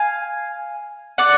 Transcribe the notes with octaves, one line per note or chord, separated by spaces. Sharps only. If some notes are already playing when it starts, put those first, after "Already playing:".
Already playing: F5 G#5
D5 F#5